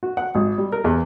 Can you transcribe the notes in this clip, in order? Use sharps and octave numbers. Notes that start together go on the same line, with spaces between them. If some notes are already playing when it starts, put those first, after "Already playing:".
F#4
F#5
G#1
G3
A#4
E2